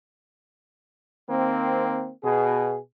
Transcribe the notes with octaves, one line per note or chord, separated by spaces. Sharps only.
D#3 A#3 C4
B2 G#4